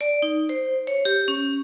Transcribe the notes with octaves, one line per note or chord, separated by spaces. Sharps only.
D5
D#4
C5
C#5
G4
C#4